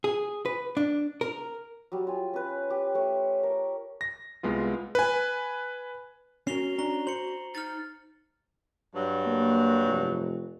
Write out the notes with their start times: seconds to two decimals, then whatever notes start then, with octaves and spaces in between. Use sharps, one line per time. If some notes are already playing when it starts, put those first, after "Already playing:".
0.04 G#4
0.46 B4
0.77 D4
1.21 A#4
1.92 F#3 G3
2.07 F4 G#5
2.34 C#4 B4
2.70 G4
2.95 A3 C#5
3.43 A#4
4.01 A#6
4.43 C2 G#3 B3 F4
4.95 B4 G#5
6.47 C#4 F#4 A#4 C7 F7 G7
6.78 C#4 D4 A#5 G7
7.07 C5 C#7 F#7
7.55 D#4 F6 A6
8.95 G2 F#3
9.26 A#3
9.86 F1